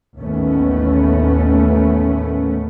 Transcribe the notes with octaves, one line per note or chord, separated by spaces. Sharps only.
A1 D#2 A3 B3 C#4